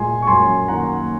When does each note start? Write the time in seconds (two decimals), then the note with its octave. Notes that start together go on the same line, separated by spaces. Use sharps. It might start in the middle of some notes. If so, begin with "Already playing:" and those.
Already playing: A#2 G#3 G#5 C6
0.22 C#6
0.27 F#2 G#5 C6
0.68 D#3 A#3 F#5 A#5